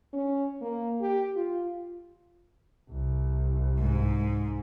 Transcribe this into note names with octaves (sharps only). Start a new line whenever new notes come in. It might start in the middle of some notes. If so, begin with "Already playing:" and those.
C#4
A#3
G4
F4
C2
G#2